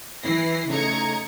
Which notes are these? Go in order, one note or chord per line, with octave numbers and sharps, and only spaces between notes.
E3 E4 A#6 C7
C#3 A3 D#4 A#5 G#6 C#7